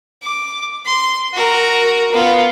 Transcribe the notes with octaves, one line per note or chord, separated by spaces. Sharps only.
D6
C6
F#4 A#4
B3 F4